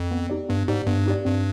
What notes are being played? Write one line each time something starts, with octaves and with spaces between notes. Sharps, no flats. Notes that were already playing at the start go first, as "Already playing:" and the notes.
Already playing: F2
B3
D#4 G4 D5
G2 B3
G#2 D#4 G4 D5
G2 B3
D#4 G4 D5
G2 C4